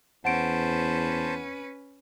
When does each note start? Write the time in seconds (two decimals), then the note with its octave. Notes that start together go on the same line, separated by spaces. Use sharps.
0.25 E2 C#4 B4 C5 F#5 A5 D7